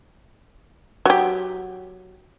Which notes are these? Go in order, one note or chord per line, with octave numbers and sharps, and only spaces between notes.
F#3 G4